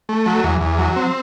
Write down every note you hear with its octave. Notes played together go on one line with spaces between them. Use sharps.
A3
F#3
E2
E2
F#3
C4